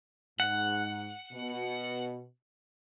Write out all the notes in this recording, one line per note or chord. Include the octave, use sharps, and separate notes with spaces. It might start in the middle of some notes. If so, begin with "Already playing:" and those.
G#2 F#5
B2